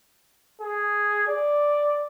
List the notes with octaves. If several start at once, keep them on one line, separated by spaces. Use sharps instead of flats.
G#4
D5